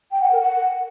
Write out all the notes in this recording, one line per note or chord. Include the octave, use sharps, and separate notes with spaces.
G5
F#5
A#4
F#5